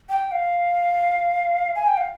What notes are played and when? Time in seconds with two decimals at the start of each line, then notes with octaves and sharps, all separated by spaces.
0.09 G5
0.32 F5
1.76 G#5
1.87 G5
1.97 F5